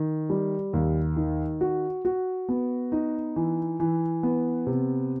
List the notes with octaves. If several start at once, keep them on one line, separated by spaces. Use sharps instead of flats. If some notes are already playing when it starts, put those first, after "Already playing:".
Already playing: D#3
G3
D#2
D#3
F#4
F#4
B3
D#4
E3
E3
B3
C3